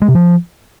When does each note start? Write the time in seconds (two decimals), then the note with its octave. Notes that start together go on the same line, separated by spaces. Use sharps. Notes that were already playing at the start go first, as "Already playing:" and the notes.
0.02 G#3
0.08 C3
0.15 F3